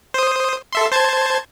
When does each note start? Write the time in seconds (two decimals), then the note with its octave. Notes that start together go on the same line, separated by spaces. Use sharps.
0.14 C5 D#6
0.72 A4 E5 C6
0.92 C5 A5 G#6